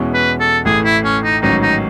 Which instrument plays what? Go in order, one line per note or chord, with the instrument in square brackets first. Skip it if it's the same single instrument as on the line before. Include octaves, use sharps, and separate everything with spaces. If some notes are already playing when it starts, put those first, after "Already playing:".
Already playing: [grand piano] E2 B2 G#3 C#4 E4
[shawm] B4
A4
[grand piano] A1 A2 E3 A3 [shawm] G#4
[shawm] E4
C#4
D#4
[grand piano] A1 G#2 D#3 F#3 C#4 [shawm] D#4
[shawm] D#4